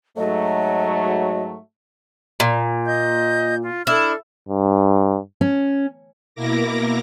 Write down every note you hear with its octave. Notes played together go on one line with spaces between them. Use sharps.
G#2 F#3 A3 D#5
A#2
D#5 G6
F4
D4 E4 A4 F6
G2
C#4
B2 A#3 E4 A#4 D6 A#6